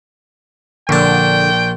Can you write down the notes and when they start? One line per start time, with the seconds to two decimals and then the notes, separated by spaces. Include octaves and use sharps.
0.89 A#1 D3 D4 G5